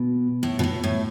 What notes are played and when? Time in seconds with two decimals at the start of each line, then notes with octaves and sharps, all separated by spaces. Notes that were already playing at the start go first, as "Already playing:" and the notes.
Already playing: B2
0.43 A2
0.59 B2
0.63 A2
0.84 A2